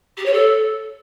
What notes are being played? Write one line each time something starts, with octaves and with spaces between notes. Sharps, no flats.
G4
C#5
A4